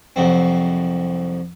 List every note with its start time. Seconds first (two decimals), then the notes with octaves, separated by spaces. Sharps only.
0.16 C2 F2 F#3 C4